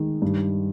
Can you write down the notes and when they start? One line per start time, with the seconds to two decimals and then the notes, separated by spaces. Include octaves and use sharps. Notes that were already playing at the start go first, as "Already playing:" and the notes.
Already playing: D#3 G#3
0.22 G2